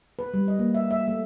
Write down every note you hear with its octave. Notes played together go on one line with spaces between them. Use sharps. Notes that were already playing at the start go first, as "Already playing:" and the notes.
B4
G3
D#5
A#3
E5
E5
A3